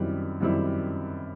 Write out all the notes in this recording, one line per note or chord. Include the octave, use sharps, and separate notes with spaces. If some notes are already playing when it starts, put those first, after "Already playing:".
Already playing: F#2 D#3 G3 C4 E4
F#2 D#3 G3 C4 E4